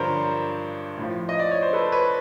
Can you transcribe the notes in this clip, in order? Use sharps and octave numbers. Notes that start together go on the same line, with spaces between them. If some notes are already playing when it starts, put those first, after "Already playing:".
Already playing: G2 D3 F3 A#4 C5 C#5
A2 F3
D#5
D5
C#5
C5
A4 B4
B4 C#5